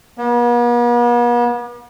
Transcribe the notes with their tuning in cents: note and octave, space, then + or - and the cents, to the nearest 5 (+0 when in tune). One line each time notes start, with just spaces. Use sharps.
B3 -45